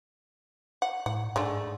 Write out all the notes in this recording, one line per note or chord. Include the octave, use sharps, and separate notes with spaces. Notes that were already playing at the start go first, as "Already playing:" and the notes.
F#5
A2 F#5
G#2 G#3 A3 D4